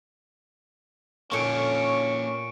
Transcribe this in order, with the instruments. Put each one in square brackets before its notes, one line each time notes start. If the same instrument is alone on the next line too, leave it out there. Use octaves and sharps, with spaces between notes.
[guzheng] A#2 A4 [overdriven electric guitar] A#3 C#5 [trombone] C#4 [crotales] C#6 C#7 D7